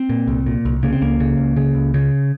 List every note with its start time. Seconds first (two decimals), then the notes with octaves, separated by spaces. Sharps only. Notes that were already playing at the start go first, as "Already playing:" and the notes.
Already playing: C4
0.09 A#2
0.28 C2
0.46 A#2
0.65 C2
0.83 C#3 A#3
0.93 C4
1.02 C#2 A#3
1.20 C#3
1.38 C#2
1.56 C#3
1.75 C#2
1.94 C#3